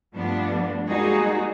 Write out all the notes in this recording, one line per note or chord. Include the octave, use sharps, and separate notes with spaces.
G2 F3 G3 A3 B3 D4
G3 G#3 A#3 D#4 F#4 G#4